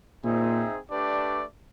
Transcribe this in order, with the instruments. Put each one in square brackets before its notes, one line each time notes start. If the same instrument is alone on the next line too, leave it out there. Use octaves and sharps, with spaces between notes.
[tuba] A#2 [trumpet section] C4 D#4 G#4 C5 E5
[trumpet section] A3 D4 G4 B4 D5